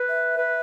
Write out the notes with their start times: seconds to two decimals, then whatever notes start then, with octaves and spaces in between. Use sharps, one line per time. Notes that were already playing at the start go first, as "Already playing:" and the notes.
Already playing: B4
0.09 E5
0.37 B4